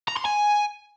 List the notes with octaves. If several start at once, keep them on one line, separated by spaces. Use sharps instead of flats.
A#5
C6
G#5